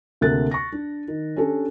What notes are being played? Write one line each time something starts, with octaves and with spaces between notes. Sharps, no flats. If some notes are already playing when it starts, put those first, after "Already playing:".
D2 C3 A#3 A4 F#6 A6
C#6 A#6
D4
D#3
C#4 D4 G4 A4